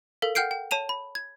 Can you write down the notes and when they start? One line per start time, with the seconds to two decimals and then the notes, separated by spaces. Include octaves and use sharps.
0.22 A4 A#4 F5
0.35 F#5 G5 F6 G6 C7 D7
0.51 G5
0.71 C#5 A5 D#7 F7
0.89 B5
1.15 G#6